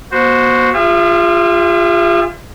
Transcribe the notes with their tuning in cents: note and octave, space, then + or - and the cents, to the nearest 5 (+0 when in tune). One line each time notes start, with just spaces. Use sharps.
B3 -45 F#4 +0 C5 +0
F4 +0 G#4 -45 E5 +35